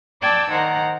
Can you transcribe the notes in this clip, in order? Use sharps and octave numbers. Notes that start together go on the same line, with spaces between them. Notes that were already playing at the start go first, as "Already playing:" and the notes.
D5 G5 A5 D6 E6 G#6
D#3 C5 F#5 A#5